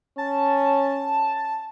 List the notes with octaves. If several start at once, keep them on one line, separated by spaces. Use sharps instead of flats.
C#4 A5